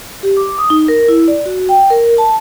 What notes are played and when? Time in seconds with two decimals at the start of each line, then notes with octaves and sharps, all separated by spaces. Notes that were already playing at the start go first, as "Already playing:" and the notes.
0.23 G4
0.37 D6
0.58 D#6
0.70 D#4
0.88 A#4
1.08 E4
1.28 D5
1.46 F#4
1.69 G5
1.90 A#4
2.18 A5